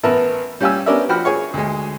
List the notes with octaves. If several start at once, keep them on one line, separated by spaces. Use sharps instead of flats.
A1 B3 A#4 B4 E5 A5
G3 C#4 G4 F5 G#5 E6
B3 C#4 D4 A#4 D5 E5
F3 F#4 G5 B5 F6
G#4 C#5 C#6
D2 G#3